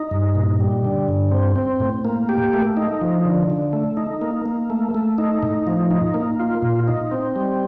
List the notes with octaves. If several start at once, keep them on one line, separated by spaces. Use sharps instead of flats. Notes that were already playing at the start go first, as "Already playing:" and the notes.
Already playing: D#4
G2
A#2
G3
D3
G2
C4
C4
A2
A#3
G4
A3
D#4
F3
D3
D3
A3
D#4
A#3
A#3
A3
A3
D#4
A2
F3
D#4
A#3
F4
A#2
D#4
C4
G3